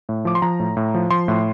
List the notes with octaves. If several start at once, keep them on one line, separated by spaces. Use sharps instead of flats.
A2
F3 D6
C6
F3 A#5
A2
A2
F3
F3 C6
A2